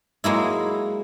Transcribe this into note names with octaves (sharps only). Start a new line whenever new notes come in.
F#3 G#3 A#3 E4